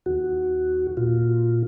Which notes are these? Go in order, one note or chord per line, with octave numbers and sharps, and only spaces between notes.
D#2 F#4
A#2 F4